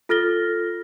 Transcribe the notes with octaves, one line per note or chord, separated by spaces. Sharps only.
F4 A4 F6 A6 A#6 G7